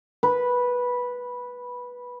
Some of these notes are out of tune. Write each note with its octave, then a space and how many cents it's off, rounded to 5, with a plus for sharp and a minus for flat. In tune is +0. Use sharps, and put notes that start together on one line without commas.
B4 -10